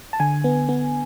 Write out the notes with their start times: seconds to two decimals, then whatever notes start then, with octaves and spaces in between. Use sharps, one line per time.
0.13 A5
0.20 D3 G#5
0.44 B3
0.69 B3